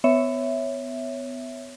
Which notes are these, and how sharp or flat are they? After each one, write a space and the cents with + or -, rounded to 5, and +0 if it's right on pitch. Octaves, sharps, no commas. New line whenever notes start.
B3 +30 C#5 +0 E5 +0